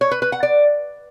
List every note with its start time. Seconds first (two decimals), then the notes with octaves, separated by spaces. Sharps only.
0.01 C#5
0.11 B4
0.22 B4
0.32 F#5
0.43 D5